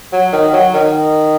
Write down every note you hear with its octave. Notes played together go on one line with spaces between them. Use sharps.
F#3
D#3
F#3
D#3